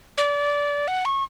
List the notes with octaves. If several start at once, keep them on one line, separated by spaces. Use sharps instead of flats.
D5
F#5
C#6